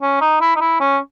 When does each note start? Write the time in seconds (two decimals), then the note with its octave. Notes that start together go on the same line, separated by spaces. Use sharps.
0.02 C#4
0.21 D#4
0.41 E4
0.56 D#4
0.60 E4
0.80 C#4